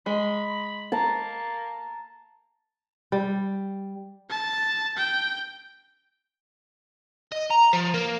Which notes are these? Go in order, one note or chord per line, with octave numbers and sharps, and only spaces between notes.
G#3 B5
A#3 A5 A#5
G3
A5
G5
D#5
A#5
F3
A#3